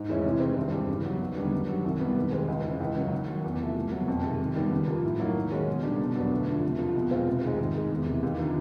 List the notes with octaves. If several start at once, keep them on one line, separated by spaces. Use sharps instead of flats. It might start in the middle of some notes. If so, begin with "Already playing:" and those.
Already playing: G#2
E3 G#3 C#4 E4
C3
D#3 G#3 C4
G2
E3 G3
C#3
F#3 B3
D#2
D3 G3 B3 D#4
F#2
D#3 F#3
C2
B2 G3 B3
D#3
G#3 C4
C#2
C#3 E3
C#2
C#3 F#3 A#3
D#3
F#3 A#3
E2
C3 F3 A3
C2
B2 F#3 A#3
F2
C3 D#3 G#3
G#2
D#3 G3 B3
C#3
F3 A#3
A2
F#3 A#3 D#4
D#3
G#3 C#4 F#4
B2
G3 A#3 D4
B2
F#3 B3 D4
D2
D3 F3 A3
C3
F3 A#3
B2
G#3 C4 F4
C3
D#3 G#3
G#2
D#3 G#3
E2
C3 E3
D#2
D3 F3 A#3 D#4